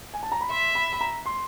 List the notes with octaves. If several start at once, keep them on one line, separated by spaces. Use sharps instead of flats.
G#5
A5
A#5
B5
E5 C6
B5
B5
A#5
C6